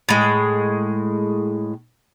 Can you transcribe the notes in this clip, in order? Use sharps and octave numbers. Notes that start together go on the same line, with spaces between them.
A2 G#3